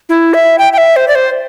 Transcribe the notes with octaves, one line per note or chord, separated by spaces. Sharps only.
E4
E5
G5
G5
E5
C5
D5
C5